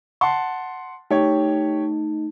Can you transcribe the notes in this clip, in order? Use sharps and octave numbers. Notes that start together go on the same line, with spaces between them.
F#5 A5 C6
A3 D#4 G4 C#5